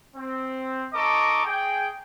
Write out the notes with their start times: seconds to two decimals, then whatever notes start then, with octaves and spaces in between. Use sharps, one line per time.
0.16 C4
0.94 D#4 A4 D#5 A#5 C#6 D6
1.45 G#4 G5